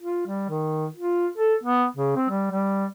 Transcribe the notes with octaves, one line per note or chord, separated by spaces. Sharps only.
F4
G3
D#3
F4
A4
B3
C#3
C4
G3
G3